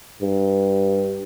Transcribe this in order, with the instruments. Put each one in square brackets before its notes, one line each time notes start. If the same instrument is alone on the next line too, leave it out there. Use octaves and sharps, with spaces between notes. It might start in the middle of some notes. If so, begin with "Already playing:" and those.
[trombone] G2